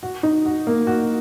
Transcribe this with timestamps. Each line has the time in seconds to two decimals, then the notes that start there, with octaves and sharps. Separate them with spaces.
0.03 F#4
0.23 D#4
0.46 F#4
0.67 A#3
0.87 F#4